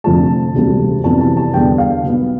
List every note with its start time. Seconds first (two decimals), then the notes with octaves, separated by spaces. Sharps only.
0.04 F1 F2 D3 F3 A3 A5
0.54 E1 D2 C3 G3
1.04 F2 C3 E3 B3 A5
1.21 A5
1.37 A5
1.54 E2 D3 G3 B3 D4 G5
1.78 F5
2.03 B1 B2 B3